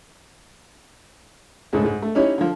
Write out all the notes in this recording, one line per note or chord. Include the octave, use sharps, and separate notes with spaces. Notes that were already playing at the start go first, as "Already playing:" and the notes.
C#2 G#2 A3
G#2
A3
C#4 D#4 E4 G4 C#5
D3 F3